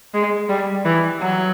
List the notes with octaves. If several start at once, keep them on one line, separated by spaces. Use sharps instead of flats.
G#3
G3
E3
F#3